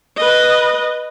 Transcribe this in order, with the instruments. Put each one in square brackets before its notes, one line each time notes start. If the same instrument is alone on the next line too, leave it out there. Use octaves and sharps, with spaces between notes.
[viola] B4 D#5